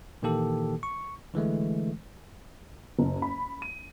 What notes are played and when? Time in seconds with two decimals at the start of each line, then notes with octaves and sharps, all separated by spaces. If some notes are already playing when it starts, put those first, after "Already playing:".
0.22 A#2 D#3 E3 A#3 G4 A4
0.83 C#6
1.34 D3 E3 G#3 A3
2.99 F#1
3.22 B5
3.62 D#7